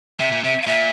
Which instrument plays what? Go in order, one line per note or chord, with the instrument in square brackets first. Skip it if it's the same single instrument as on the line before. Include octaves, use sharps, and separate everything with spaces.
[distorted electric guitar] C3 [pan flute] E5
[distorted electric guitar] A#2
[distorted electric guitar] C3 [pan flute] E5
[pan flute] F5
[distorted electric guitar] A#2 [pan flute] E5